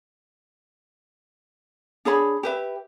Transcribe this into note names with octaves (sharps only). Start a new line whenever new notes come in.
D4 G#4 C#5 B5
G4 B4 E5